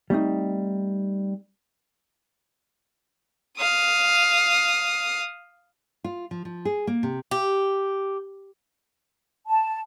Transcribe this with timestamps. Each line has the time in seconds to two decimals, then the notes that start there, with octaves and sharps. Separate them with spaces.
0.10 G3 A3 C4 D#4
3.58 F5 D#6
6.04 F4
6.31 F3
6.45 F3
6.65 G#4
6.87 A#3
7.03 C3
7.31 G4
9.48 A5